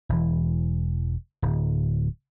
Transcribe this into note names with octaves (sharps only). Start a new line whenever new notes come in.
E1 E3
D1